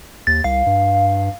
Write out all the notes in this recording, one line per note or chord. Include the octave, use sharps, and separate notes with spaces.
D#2 A6
C2 F5
G2